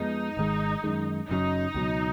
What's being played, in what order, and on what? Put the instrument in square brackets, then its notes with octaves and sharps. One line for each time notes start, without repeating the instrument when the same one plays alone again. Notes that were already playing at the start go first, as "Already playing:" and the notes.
Already playing: [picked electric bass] F2 F3 G#3 B3 [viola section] D#4
[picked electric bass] G#1 G#2 D#3 G#3
F#2 D#3 G#3
[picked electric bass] F#1 F#2 C#3 F#3 [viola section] D#4
[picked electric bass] C#2 B2 F#3